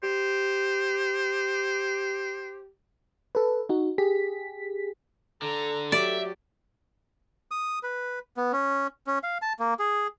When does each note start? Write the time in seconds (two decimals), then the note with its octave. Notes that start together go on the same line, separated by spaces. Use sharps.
0.03 G4 C5
3.35 A4 B4
3.69 D#4 F#4
3.98 G4 G#4 B6
5.42 D3 A4 A#5
5.92 F#3 G4 D5 E5
7.51 D#6
7.83 B4
8.37 B3
8.53 C#4
9.07 C#4
9.23 F5
9.42 A5
9.59 A#3
9.79 G#4